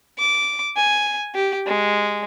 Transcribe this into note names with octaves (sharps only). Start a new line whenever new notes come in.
D6
G#5
G4
G#3